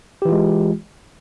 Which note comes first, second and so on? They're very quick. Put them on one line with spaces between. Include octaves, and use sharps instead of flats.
G4 E3 F4 G#3